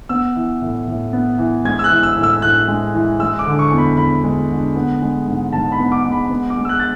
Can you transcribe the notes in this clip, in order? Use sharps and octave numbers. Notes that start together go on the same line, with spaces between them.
B3 E6
E3
A2
A2
B3
E3
G#3 G#6
E6
F#6
E3
E6
A2
E6
A2 F#6
G#3
E3
G#3 E6
D6
D3
C#6
E2
B5
E2 B5
G#3
D3
B3
G#3
G#2
G#2 A5
B5
B3
D6
G#3
B5
B3
D6
G#3
E6
F#6
A6